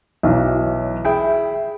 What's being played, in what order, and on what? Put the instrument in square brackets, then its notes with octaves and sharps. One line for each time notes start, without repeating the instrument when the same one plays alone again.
[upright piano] B1 E3 F#3
[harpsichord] E4 G5 [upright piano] G#4